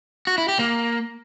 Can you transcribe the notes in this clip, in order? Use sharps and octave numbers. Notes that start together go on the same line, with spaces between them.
F#4
E4
G4
A#3